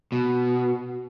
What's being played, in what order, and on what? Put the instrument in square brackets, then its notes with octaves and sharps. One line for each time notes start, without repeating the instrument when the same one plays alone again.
[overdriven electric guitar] B2